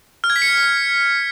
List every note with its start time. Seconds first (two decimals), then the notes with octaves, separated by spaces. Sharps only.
0.24 F6
0.30 G#6
0.36 B6
0.42 C#7